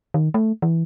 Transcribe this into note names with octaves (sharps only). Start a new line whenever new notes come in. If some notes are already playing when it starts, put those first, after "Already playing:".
D#3
A3
E3